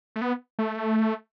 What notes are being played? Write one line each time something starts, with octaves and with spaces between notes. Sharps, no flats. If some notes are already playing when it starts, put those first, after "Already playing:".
A3
B3
A3